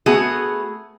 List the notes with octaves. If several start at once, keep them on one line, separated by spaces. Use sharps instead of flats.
A3 B3 F#4 G#4